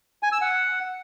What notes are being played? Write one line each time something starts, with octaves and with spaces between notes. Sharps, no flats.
G#5
E6
F#5